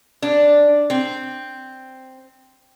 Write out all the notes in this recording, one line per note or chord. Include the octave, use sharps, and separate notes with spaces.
D4
C4